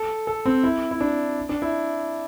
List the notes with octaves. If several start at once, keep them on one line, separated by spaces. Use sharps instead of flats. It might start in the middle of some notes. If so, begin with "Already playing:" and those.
Already playing: A4
A4
C4
E4
E4
D4
D4
E4